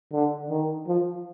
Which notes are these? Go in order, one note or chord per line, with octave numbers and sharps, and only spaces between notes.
D3
D#3
F3